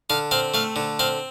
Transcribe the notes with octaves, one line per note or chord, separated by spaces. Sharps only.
D3 F5
C4 F5
A3 F5
D3
C4 F5